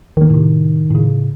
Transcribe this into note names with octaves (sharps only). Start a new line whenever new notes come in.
D1 D#3 A#3
A2 C3
A2 C#3